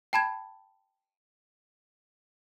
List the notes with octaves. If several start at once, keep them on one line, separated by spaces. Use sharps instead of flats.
G5 A5 B5 G#6